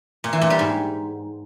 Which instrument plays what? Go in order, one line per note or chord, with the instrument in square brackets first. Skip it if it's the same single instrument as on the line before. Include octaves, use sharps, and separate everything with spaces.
[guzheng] A#2
E3
A#2
G3
G#2